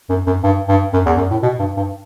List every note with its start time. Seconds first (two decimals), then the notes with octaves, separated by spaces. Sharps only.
0.09 F#2
0.27 F#2
0.43 G2
0.68 G2
0.93 F#2
1.06 E2
1.17 F#2
1.31 A2
1.43 B2
1.59 G2
1.77 G2